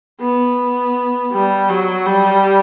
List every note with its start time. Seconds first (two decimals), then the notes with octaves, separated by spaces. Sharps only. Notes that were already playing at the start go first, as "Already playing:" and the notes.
0.20 B3
1.33 G3
1.70 F#3
2.06 G3